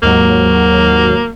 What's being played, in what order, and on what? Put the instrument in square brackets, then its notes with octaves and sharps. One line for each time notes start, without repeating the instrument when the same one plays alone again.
[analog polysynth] D#2 G#2 F#3 [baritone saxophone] A#3